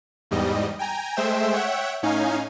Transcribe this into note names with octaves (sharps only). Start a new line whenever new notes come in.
E2 G#2 G3 D#5
G5 G#5 A#5
G#3 A3 C5 E5 G5 E7
C#5 E5 F#5 G5
A2 C#4 D#4 F5 G#5